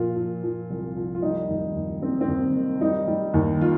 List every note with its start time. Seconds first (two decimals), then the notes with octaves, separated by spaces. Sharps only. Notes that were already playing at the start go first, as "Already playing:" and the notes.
Already playing: A#2 F3 F4
0.16 F3
0.43 F3
0.70 C2
0.96 F3
1.15 F4
1.22 G3 D#4
1.49 D#2
1.75 D#2
2.02 G3 C4
2.21 C4
2.28 D#2
2.54 D#3
2.81 G3 D#4
3.08 G3
3.34 D#2
3.61 D#3 F4